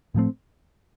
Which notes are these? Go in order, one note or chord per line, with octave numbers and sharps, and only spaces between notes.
A2 F3 A3 C4